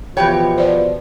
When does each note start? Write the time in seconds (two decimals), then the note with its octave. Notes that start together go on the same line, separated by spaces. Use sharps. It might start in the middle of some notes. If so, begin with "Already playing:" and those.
0.17 B2 E3 F3 G4 C#5 E5 G5 B5
0.58 C5 D5